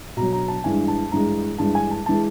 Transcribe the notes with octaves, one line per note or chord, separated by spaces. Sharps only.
B2 F#3 A#5
A#5
A5
G2 E3 G#3 G#5
A5
G2 E3 G#3 A#5
G2 E3 G#3 A5
G#5
A5
E3 G#3 A5